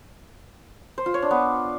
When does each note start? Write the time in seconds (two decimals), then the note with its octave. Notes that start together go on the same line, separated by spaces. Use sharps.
0.98 C5
1.06 F4
1.14 C#5
1.22 D4
1.31 B3